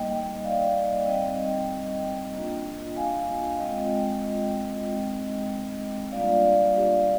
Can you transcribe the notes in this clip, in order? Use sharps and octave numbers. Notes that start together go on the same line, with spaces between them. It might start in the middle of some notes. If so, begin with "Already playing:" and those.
Already playing: G3 A#3 D#4 D#5 G5
D5 F5
G3 C4 D#4 D#5 G5
A#3 D4 F4
F5 G#5
G#3 C4 F4 D#5 G5
G#3 C4 D#4
G3 A#3 D4 F4 D5 F5
G4